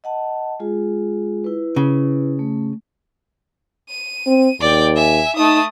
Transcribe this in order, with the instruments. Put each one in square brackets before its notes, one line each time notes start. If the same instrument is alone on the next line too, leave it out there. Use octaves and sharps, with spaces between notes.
[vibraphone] D#5 F#5 A5
G#3 F4 G#4
E4 B4
[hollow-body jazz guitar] C#3
[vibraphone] A3
[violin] D#7
[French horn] C4
[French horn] D#2 [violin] D5 G5
[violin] E5 G#5
[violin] A3 D#6 [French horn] D#4